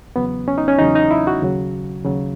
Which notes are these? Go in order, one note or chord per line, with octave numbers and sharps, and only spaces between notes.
E2 C#3 F#3 B3
C#4
D#4
C#4
E2 C#3 F#3 D#4
D#4
E4
F#4
D#2 C#3 F#3
D#2 C#3 F#3